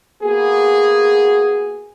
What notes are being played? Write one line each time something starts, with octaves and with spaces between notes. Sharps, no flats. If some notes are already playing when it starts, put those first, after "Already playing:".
A#3 B3 F#4 G#4